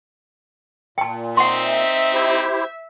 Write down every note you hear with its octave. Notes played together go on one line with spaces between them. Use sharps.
A#2 G5 A5
C4 D#4 E5 F#5 C6
E4 G4 C5